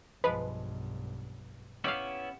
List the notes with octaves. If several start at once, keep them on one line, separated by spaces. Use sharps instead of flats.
B1 G2 F3 G#3 B4
B3 C#4 E4 G4 E5 F5